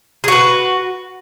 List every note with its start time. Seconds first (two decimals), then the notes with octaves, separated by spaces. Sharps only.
0.24 G#4
0.28 F#4
0.32 B4